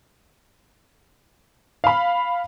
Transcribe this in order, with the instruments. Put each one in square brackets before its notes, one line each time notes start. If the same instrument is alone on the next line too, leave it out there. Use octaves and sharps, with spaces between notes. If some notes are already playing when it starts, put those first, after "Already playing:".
[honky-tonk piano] F5 B5